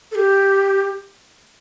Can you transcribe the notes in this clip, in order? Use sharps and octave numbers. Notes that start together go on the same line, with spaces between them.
A4
G4